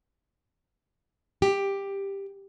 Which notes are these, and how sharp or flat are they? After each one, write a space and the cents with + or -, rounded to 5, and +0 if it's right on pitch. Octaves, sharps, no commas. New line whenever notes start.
G4 +10